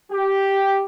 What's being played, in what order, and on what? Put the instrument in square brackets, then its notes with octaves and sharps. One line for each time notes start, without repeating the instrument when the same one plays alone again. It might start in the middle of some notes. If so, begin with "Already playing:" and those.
[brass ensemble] G4